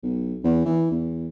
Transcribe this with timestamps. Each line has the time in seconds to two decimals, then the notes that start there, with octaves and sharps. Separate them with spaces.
0.03 B1
0.44 E2
0.65 E3
0.91 E2